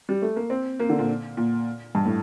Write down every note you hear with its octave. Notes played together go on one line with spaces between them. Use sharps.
G3
A3
A#3
C4
A#3
D3
A#2
A#2
G2
A2